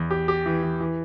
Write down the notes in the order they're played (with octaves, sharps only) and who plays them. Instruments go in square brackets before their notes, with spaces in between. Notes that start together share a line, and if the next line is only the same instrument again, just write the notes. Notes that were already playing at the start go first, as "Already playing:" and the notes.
Already playing: [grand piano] E2
G4
G4
E3
E3
E3